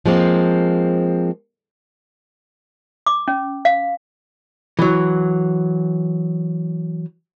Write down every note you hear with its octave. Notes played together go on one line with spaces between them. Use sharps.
F3 G#3 A#3 C4
D6
C#4
F5
E3 F#3